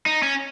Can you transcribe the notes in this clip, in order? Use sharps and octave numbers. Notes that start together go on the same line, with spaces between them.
D#4
C#4